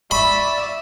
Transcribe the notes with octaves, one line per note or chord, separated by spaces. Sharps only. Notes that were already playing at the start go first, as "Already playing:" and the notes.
D5 E5 B5 C#6